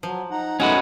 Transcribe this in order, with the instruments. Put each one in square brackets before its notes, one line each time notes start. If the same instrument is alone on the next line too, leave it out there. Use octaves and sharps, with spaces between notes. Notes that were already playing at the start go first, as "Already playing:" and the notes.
[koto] F3 [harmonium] F#3
[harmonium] D#4 F#5 A#5
[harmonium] D#3 A3 D#4 [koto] G#3 [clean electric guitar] C#4 F#4 B4